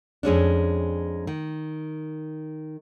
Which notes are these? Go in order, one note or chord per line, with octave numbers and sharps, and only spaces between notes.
F2 G#3 C#4 D4
D#3